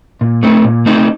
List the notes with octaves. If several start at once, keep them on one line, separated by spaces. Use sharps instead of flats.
A#2
A3 C4 D#4
A#2
A3 C4 D#4